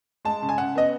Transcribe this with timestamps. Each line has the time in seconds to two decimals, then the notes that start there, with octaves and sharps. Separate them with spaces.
0.25 G#3 A5
0.42 C#3
0.49 G#5
0.58 C#3 F#5
0.75 B3 D#5